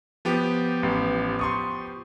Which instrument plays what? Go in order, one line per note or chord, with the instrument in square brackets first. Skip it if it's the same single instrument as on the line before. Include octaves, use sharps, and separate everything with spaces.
[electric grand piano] F3 B3 G4
[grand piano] A1
C6 C#6 D#6